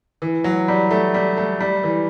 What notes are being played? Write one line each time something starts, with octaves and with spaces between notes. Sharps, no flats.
E3
F#3
G3
A3
G3
A3
G3
E3